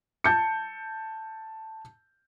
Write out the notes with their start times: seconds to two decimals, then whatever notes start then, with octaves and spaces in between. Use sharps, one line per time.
0.24 A5 G6 C#7